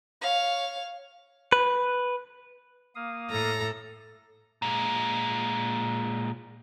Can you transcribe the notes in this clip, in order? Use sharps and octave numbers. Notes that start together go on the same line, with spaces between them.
C#5 F5
B4
A#3 F5 D#6
A2 A4 A#5
A#2 G#3